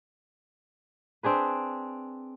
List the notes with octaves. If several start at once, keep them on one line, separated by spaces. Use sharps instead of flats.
C4 D4 G#4 B4